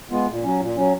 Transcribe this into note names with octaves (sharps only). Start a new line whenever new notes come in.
G#3 B3 F4
A#2
F#3 C#4
A#2
F#3 C#4